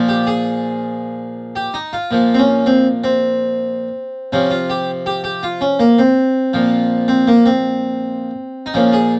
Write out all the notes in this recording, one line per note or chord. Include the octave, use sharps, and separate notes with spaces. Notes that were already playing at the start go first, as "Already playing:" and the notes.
Already playing: A#2 F3
G4
G#4
G4
D#4
F4
A#2 F3
C4
C#4
C4
C4
C3 F3 C#4
F4
G4
G4
G4
F4
C#4
A#3
C4
A#2 F3
C4
A#3
C4
D#4
A#2 F3 C#4
G#4